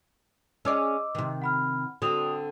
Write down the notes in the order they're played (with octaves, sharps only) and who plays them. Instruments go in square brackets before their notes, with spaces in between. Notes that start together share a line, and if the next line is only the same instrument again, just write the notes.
[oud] C#4 G#4 D5 [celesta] D#5 D6 E6
[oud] C3 D#3
[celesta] F#5 B5 F6
[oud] D3 C4 [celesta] F#4 D#6 F7